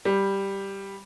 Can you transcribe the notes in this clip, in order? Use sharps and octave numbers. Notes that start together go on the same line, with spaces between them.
G3